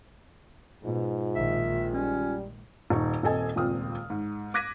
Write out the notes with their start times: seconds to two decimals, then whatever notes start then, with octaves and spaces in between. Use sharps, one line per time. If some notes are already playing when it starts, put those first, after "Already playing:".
0.84 G#2 B2 F4
1.36 A#1 D#3 G#3 E5
1.93 G3 C#4
2.90 D#1 D#4 C#6
3.23 D#1 C4 A4 D#5 G#5
3.56 D#1 C#2 A#2 C4 D#6 F6
4.10 G#2
4.54 D6 F#6 G#6 A#6 B6 D#7